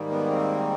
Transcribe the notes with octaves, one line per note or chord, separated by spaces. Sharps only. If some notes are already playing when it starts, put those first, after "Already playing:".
Already playing: G#2 D#3 G3 A#3
B3
C4